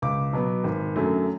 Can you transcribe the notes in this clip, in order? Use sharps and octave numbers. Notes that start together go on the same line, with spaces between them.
C#2 D6
B2 F#3 B3
G#1
F#2 D3 F#3 A3